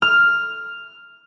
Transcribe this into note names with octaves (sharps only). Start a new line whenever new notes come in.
F6